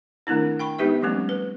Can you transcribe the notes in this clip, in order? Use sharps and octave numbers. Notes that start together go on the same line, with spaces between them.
D#3 A3 C4 D4 E4
G5 B5 C#6
G#3 B3 D#4 G4 B4 E5
F3 G3 A3 C4 C#4
B4